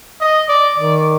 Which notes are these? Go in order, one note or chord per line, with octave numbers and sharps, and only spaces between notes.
D#5
D5
D#3 D5